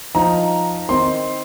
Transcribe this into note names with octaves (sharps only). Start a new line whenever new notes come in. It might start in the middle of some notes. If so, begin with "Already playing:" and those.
F3 D#4 A#5
D#3 C4 D#4 C6